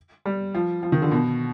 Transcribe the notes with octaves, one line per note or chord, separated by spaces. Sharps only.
G3
F3
F3
D#3
D3
B2